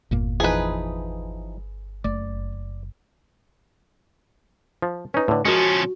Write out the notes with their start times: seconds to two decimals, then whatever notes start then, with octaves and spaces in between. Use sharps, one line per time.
0.11 G1 E2 A#2 A#3
0.40 E3 F3 D#4 G#4 B4
2.04 F#1 A3 D5
4.82 F3
5.14 C#4 D#4 B4
5.28 A2 D3
5.45 F3 G#3 C#4 F#4 A#4